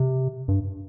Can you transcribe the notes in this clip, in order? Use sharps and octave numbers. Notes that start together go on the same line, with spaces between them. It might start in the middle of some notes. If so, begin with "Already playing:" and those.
Already playing: C3
G2